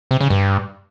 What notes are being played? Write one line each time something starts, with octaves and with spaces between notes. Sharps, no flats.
C3
C#3
G2